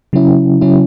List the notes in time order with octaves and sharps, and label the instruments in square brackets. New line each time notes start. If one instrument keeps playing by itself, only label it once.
[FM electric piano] C#3 F#3 C#4 E4
C#3 F#3 C#4 E4